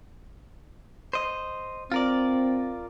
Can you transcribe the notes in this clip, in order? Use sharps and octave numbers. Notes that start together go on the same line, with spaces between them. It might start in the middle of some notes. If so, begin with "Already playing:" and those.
C5 D#5
C4 F4 A#4 D5